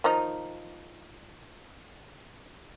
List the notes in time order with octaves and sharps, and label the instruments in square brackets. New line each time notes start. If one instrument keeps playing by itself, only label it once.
[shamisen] D#3 F3 D#4